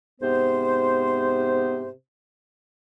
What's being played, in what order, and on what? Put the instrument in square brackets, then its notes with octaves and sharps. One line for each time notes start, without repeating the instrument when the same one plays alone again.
[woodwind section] G#2 C3 B3 C5